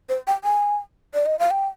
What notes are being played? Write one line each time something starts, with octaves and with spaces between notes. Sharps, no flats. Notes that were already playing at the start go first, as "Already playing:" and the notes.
C5
G5
G#5
D5
D#5
F5
G5